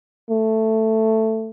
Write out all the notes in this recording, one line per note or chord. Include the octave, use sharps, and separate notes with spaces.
A3